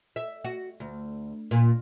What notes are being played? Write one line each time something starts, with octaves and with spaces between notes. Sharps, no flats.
E5
F#4
D2
A#2